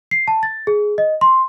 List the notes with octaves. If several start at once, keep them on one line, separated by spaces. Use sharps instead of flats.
C7
A5
A6
G#4
D#5
C6